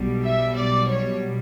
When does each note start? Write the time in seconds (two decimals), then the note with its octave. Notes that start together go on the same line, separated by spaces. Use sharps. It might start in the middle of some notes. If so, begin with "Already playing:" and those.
Already playing: B1 B2 G3
0.24 E5
0.55 D5
0.88 C#5